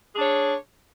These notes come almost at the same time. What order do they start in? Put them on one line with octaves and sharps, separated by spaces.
G#4 D4 C#5